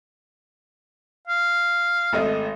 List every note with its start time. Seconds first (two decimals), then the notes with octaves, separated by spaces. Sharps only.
1.27 F5
2.13 G#1 A3 D#5